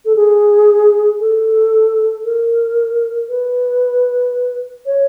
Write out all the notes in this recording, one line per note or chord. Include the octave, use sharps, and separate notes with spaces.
A4
G#4
A4
A#4
B4
C#5